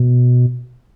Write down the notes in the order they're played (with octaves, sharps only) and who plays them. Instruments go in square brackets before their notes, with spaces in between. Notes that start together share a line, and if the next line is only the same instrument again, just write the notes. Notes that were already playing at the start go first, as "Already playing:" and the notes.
Already playing: [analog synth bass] B2